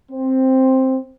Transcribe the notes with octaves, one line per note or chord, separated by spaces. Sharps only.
C4